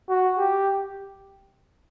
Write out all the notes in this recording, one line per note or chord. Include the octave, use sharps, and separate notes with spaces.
F#4
G4